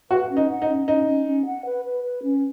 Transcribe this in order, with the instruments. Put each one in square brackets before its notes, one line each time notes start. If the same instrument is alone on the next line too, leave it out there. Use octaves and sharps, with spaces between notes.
[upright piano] F#4 [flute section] B4
[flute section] C#4
[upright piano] D#4
[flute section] F#5
[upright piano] D#4
[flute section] C#4
[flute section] C#4 [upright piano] D#4
[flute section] C#4
C#4
F#5
B4
B4
B4
C#4